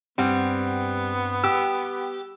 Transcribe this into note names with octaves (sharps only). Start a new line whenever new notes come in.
G2 G3 B3 C4 F#5
G4 E6